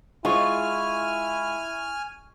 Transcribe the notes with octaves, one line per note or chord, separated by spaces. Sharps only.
G#3 E4 F4 G#5 C#6 F6